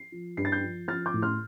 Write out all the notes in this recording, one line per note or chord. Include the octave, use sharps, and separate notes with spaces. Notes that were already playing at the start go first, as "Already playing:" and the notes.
Already playing: C7
F3
G2 C7
A6
G6 C7
F3
F3 F6 A6
D6 G6
A2
C6 F6